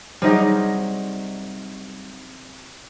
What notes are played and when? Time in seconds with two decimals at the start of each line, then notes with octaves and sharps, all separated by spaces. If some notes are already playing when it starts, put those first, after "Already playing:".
0.22 C3 F#3 G3 D#4 G#4 D#5